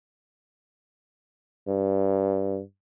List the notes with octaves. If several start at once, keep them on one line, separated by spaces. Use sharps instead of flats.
G2